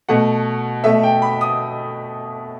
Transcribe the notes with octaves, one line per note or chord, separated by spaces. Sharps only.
B2 A3 F#5
B2 A3 E5
G5
B5
D#6